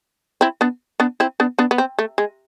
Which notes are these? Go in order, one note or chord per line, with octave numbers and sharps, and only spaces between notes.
C4 E4
B3 D4
B3 D4
C4 E4
B3 D4
B3 D4
B3
C4
A3
G#3